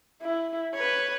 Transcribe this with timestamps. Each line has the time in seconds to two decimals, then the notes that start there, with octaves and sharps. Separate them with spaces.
0.22 E4
0.74 B4 C#5